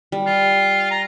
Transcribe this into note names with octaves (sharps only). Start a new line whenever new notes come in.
G3
F4
A#5